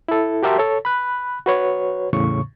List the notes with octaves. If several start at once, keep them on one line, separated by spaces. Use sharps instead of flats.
E4 A4
F#4 G4 A#4 E5 A5 C6
A4 C#5
B5 F#6
F#4 B4 C#5
E2 A2 C#3 C#6